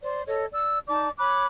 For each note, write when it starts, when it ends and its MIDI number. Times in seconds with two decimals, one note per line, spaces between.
0.01 0.22 72
0.01 0.22 74
0.27 0.46 69
0.27 0.46 73
0.27 0.46 75
0.53 0.79 74
0.53 0.79 88
0.88 1.10 63
0.88 1.10 74
0.88 1.10 81
0.88 1.10 86
1.19 1.45 73
1.19 1.45 83
1.19 1.45 86
1.19 1.45 90